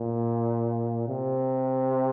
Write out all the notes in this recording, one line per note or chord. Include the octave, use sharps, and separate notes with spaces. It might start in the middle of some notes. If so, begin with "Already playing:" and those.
Already playing: A#2
C3